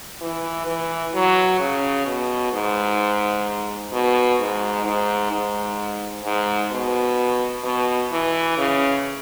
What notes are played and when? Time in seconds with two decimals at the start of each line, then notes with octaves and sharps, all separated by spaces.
0.21 E3
0.67 E3
1.14 F#3
1.60 C#3
2.06 B2
2.52 G#2
3.93 B2
4.40 G#2
4.86 G#2
5.32 G#2
6.24 G#2
6.71 B2
7.64 B2
8.11 E3
8.58 C#3